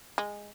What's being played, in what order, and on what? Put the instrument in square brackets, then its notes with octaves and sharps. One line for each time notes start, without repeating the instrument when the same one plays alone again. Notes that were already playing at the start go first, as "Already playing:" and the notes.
[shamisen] G#3